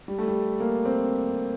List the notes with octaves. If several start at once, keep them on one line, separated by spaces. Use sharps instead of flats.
G3
A3
G3
A#3
C4